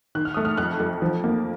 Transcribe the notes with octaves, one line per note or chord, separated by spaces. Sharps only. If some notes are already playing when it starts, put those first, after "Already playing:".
D#3 F#6
F6
A3 D#6
F6
F2 F#6
F2
F3
A#3